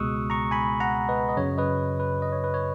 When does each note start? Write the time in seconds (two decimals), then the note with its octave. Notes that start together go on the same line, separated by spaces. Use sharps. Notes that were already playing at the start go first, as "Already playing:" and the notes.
Already playing: C#2 B2 G#3 C#6 D#6 E6 F#6
0.30 A#5 C#6
0.51 G#5 B5
0.80 F#5 A#5
1.09 B4 D#5
1.29 D#5
1.37 F#2 C#3 F#3 C#5
1.58 B4 D#5
2.00 B4
2.22 D#5
2.32 C#5
2.44 B4
2.54 C#5